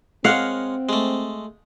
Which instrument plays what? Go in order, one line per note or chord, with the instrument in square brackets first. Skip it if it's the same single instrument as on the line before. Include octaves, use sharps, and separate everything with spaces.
[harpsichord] G#3 A#4 C#5 [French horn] C4 [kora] F5 F#5
[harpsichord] G#3 A3